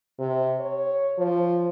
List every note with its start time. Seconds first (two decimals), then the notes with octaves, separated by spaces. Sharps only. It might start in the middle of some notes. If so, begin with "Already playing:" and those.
0.19 C3
0.60 C#5
1.18 F3